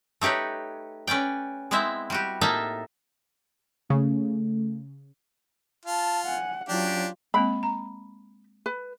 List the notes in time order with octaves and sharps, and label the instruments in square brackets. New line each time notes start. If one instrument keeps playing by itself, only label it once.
[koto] A3 D#4 G4 B4 C#5
C#4 B4 D5 G5
G#3 B3 C4 E4 E5
G3 F#4 G4
A2 A#3 D#4 E5 A5
[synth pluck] C#3 [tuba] A3
[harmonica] F4 [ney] A5
[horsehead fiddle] F#5 [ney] G#5
[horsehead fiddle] F#3 F4 [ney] C#4 [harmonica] D4 G4
[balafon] G#3 A#3 C4 [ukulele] B5
[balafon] A#5
[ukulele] B4